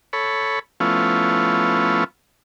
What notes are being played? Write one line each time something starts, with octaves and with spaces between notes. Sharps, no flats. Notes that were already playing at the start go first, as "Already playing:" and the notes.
A4 C#5 B5
F3 A3 B3 C#4 E4 F4